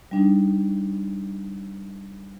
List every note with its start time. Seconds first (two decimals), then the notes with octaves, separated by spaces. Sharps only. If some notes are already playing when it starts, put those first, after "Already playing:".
0.11 G3 D4 D#4